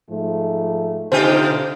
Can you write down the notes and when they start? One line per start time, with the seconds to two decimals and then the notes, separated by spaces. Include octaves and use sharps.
0.10 G#2 F3 A3
1.12 B2 D3 D#4 F4 G4 C5